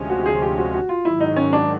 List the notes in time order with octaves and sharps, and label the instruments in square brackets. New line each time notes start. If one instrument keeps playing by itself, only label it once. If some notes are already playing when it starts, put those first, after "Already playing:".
Already playing: [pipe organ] D2 C3 F3 G#3 C#4
[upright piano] F#4
G#4
G4
F#4
F#4
F4
[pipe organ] G#2 D#3 F#3 [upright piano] E4
[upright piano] D#4
C#4
D4